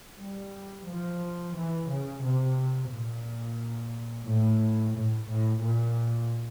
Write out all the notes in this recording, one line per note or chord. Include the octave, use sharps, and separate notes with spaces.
G3
F3
E3
C#3
C3
A#2
A2
A2
A2
A#2